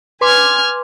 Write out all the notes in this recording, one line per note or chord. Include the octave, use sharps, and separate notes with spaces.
B4 G#5 C6 D6 F6 G#6